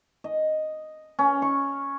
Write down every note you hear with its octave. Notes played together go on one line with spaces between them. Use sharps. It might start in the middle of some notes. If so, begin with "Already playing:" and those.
D#5
C#4
C#6